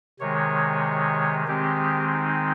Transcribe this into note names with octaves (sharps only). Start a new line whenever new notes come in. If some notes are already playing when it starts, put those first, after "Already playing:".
C3 D#3 G#3 C#5
D#3 G#3 C4 G4
D#4